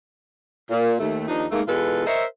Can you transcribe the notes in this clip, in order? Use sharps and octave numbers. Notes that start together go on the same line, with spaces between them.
A#2
D#2 A3
D#2 F3 D4 D#4
G#2 A3 A#3
B2 E3 G#3 F4 A4 B4
A#4 C5 C#5 D#5 E5